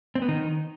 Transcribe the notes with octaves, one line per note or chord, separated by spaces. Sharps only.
C4
B3
D#3